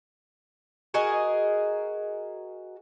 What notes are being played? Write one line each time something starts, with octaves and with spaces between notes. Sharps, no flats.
F#4 G#4 A#4 D#5